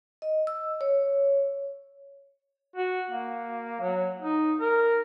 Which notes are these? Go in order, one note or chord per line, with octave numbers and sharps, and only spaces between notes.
D#5
E6
C#5
F#4
A#3
F#3
D#4
A#4